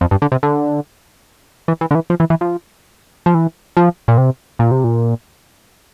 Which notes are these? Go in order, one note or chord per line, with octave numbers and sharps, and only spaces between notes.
F2
G2
D3
C3
D3
E3
E3
D3
E3
F3
E3
E3
F3
F3
E3
F3
A#2
C3
A#2
C3
A#2